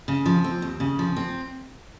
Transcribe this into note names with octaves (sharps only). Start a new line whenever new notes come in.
C#3
F3
C4
D#2
C#3
F3
C4